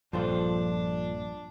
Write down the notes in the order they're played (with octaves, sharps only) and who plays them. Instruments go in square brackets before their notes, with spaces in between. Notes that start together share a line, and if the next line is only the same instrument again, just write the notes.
[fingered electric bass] A#1 [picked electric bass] G2 [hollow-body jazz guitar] F3 A4 C5 [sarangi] D4